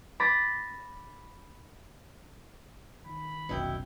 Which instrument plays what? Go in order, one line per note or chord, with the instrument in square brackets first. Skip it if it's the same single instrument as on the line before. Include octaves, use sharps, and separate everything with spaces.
[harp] B5 D6 A6 A#6
[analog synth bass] D#3 [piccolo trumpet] B5
[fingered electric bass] F1 B1 C#4 [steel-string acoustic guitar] B2 E4 G5